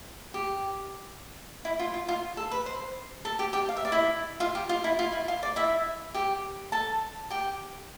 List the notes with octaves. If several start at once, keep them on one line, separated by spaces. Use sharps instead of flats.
G4
E4
F4
F4
F4
A4
B4
C5
A4 A5
G4 G5
G4 G5
F5
E5
D5
E4 E5
F4 F5
G4
F4
E4
F4
E4
F4
D5
E4 E5
G4 G5
A4 A5
G4 G5